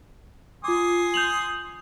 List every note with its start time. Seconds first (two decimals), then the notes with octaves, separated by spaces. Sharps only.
0.64 F4 G#5 C6 D6 D#6
1.14 G6 F7 F#7